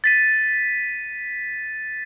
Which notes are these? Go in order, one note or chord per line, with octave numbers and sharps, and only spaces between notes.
A6 B6 D#7